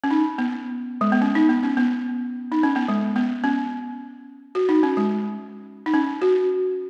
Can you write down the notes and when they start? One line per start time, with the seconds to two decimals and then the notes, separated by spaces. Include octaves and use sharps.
0.04 C#4
0.11 D#4
0.38 B3
1.01 G#3
1.12 B3
1.21 C#4
1.35 D#4
1.49 B3
1.63 C#4
1.77 B3
2.52 D#4
2.63 C#4
2.76 B3
2.88 G#3
3.16 B3
3.44 C#4
4.55 F#4
4.69 D#4
4.83 C#4
4.97 G#3
5.86 D#4
5.94 C#4
6.22 F#4